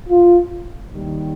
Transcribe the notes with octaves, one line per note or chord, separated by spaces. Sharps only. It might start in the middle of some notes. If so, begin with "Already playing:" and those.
F4
D#2 D#3 G3